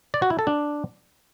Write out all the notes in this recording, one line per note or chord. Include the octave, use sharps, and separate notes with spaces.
D5
F#4
E4
A4
D4